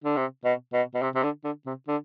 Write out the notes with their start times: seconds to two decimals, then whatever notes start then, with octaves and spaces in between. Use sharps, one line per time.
0.04 D3
0.16 C3
0.45 B2
0.73 B2
0.94 B2
1.02 C3
1.15 C3
1.23 D3
1.44 D3
1.66 C3
1.88 D3